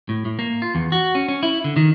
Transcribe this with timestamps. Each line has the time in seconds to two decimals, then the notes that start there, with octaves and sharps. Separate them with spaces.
0.09 A2
0.25 A2
0.39 A#3
0.62 F4
0.75 E2
0.92 F#4
1.15 C#4
1.28 C#4
1.43 E4
1.64 D3
1.76 D#3